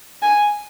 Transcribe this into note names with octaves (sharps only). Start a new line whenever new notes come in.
G#5